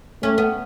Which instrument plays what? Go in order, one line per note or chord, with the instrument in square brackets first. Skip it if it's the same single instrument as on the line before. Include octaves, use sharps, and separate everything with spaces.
[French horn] A3 [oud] C#4
[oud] B3